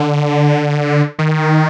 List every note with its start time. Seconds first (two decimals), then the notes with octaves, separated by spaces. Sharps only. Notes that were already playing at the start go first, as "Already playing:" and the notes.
Already playing: D3
1.19 D#3